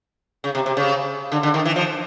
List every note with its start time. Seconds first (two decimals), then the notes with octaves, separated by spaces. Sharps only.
0.44 C#3
0.55 C3
0.66 C3
0.77 C#3
1.32 D3
1.43 D3
1.54 D#3
1.65 E3
1.76 F3